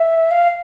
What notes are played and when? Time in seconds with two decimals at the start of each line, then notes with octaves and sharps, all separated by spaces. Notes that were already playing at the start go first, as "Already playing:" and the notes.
Already playing: E5
0.31 F5